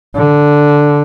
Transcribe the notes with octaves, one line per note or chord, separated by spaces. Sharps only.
D3